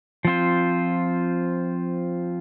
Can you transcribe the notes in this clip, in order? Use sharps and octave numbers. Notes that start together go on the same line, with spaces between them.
F3 C4 F4 C5